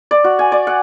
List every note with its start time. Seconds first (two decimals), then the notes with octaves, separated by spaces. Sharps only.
0.11 D5
0.24 F#4
0.39 G#5
0.52 D5
0.67 F#5